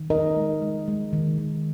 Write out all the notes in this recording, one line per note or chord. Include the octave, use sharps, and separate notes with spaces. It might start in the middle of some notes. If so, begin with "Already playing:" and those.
Already playing: D#3
D#4 A#4 D#5
G#3
G#3
G#3
D#3
D#3